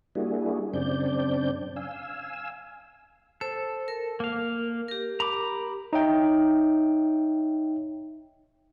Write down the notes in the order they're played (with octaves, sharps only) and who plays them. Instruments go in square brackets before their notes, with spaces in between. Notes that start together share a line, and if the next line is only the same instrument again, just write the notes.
[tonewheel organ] G3 A#3 D4 E4 F#4 G#4
F#2 C#3 C4 D4 D5 G6
F5 G#5 E6
[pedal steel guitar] A4 [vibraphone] C5
[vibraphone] A#4
[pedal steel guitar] A#3 F5
[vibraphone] G4 A#4
[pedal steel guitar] A#5 B5 D6
[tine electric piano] D#4 C#5 E5 G5